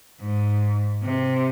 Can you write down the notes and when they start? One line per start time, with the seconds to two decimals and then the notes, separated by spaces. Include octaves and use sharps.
0.20 G#2
1.03 C3